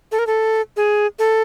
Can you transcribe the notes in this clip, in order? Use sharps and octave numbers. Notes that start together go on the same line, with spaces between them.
A4
A#4
A4
G#4
A4